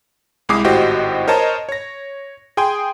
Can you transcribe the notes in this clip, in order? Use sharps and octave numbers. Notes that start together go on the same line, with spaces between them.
C2 G#3 E4 D6 D#6 C7
G#1 A2 F#4 G4 C5 D#5
A#4 C5 C#5 D#5 A5 A#5
C#5 A#6
G#4 G5 G#5 C6 D#6